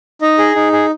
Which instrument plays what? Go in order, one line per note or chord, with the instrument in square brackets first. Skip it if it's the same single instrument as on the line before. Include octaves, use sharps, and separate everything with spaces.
[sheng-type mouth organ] D#4 D#5
G#4
D#4
G#4